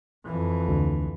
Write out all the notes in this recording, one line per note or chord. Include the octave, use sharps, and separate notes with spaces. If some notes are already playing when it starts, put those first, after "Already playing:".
F2 E3
D2